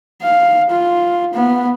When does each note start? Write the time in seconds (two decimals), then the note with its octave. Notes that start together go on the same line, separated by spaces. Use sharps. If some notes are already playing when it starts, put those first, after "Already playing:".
0.22 F5
0.71 F4
1.34 B3